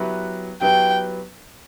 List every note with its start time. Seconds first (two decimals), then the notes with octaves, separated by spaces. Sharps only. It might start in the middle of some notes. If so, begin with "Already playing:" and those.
Already playing: F#3 B3 E4 G4 B4
0.61 F#3 B3 E4 G4 B4 G5